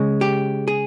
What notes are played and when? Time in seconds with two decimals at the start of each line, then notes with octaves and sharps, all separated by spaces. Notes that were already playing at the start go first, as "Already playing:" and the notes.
Already playing: C#3 G#3
0.21 G4
0.68 G#4